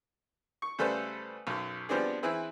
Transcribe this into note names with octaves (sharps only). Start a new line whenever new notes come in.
C#6
C#3 G3 A3 A4 B4 C5
B1 F#2
F3 G3 B3 C4 D4 G#4
E3 C4 E4 G#4 B4